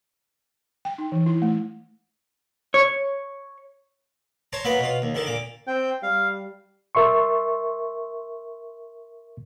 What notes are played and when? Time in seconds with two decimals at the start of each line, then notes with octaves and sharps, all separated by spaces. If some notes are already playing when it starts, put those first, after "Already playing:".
0.85 G5
0.98 D#4
1.12 E3
1.26 E4
1.42 A3
2.74 C#5
4.53 C5 C#5 A5 A#5
4.65 F#3 A#3 B3 B4
4.79 B2 F4
5.02 D#2
5.15 D3 D#3 A5
5.26 A#2 D6
5.67 C4 G5
6.03 G3 F5
6.95 A#4 E5 C6 C#6